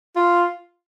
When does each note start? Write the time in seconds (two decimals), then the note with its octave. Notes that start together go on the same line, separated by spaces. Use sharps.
0.16 F4